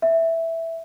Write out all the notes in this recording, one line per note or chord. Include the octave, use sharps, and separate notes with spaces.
E5